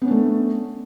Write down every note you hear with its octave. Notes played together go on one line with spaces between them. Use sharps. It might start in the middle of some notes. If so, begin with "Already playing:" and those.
A3 B3 C#4 D4